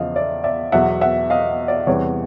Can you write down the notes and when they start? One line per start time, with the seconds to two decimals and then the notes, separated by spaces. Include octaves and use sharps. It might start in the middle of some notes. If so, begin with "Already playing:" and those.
Already playing: E2 C#3 F3 D#5 F5
0.16 D5 E5
0.44 D5 E5
0.72 E2 B2 F#3 E5 F#5
1.01 E5 F#5
1.30 D#5 F5
1.68 D5
1.87 E2 C3 E3 G3 C#5